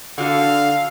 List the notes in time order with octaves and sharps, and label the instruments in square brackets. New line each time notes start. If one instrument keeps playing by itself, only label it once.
[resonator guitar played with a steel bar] D3 F#4 A4 [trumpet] F5